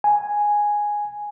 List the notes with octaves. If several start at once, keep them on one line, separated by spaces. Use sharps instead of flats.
G#5